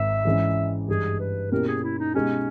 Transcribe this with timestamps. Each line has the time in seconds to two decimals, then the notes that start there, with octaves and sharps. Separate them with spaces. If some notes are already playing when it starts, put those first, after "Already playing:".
Already playing: G#1 G#2 D#3 E5
0.25 G#2 E3 G#3 C#4
0.88 G2 E3 G#3 G#4
1.20 B4
1.51 B2 A#3 C#4 E4 G4 A#4
1.68 G#4
1.83 E4
1.99 D#4
2.14 B2 G#3 C#4 D#4 G4